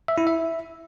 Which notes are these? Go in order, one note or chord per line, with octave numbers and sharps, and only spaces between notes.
E5
E4
E5